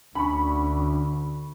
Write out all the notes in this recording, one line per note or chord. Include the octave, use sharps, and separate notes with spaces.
D2 C#4 D4 B5 C#6